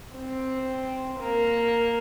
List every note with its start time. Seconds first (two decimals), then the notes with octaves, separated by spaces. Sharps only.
0.16 C4
1.19 A#3